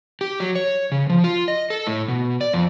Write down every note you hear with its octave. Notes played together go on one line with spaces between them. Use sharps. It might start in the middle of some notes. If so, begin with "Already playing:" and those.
G4
F#3
C#5
C#3
F3
F4
D#5
A4
A2
B2
D5
F2